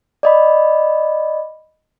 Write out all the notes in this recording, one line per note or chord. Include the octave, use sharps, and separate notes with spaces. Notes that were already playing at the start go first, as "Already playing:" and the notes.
D5 D#5 B5